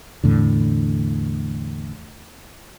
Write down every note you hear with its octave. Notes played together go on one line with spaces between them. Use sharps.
E2 A2 D3